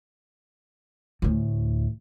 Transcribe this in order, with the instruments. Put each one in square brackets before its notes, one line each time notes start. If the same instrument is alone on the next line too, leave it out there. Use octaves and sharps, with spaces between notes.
[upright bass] D2 A2